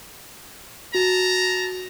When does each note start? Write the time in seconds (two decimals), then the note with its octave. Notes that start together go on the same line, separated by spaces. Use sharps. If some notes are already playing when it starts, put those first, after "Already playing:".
0.95 F#4 A5 A#5